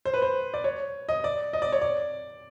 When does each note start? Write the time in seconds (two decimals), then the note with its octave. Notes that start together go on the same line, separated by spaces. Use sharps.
0.05 C5
0.14 B4
0.22 C5
0.54 D5
0.64 C#5
1.09 D#5
1.24 D5
1.53 D#5
1.62 D5
1.72 C#5
1.81 D5